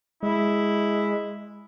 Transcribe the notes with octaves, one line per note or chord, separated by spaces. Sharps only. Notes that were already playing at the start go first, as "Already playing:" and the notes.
G#3 E4